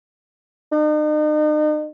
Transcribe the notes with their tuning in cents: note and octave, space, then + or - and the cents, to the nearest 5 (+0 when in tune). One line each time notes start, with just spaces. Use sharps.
D#4 -40